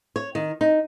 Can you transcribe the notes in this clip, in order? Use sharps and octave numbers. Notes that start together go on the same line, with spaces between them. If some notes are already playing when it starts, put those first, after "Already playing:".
C#5
D#3
D#4